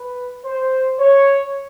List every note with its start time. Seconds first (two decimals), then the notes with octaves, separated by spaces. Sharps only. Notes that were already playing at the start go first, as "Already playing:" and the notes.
Already playing: B4
0.45 C5
1.00 C#5